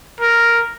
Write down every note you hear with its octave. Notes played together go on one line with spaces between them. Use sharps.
A#4